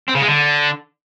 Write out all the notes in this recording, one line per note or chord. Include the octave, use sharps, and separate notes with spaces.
C4
C#3
G#3
D3